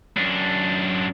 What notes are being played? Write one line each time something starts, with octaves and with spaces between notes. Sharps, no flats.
F#2 D4